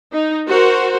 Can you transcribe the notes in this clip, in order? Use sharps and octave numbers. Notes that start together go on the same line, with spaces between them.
D#4
F#4 A#4 C5